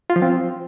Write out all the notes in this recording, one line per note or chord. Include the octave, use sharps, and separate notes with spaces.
F4
F3
C4